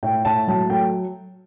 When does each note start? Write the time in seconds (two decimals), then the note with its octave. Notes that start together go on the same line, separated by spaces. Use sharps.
0.03 A2 G5
0.25 A2 A5
0.48 F#3 A5
0.70 A3 G5